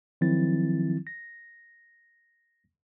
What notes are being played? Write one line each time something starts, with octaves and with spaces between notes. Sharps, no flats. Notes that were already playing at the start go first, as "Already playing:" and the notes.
D#3 F3 F#3 C4 E4 A6
A#6